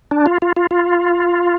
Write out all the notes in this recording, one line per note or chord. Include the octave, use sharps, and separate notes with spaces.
D4
F4
F4
F4
F4